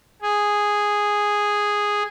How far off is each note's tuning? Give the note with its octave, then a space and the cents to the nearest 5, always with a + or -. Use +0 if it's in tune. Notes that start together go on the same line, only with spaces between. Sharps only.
G#4 -5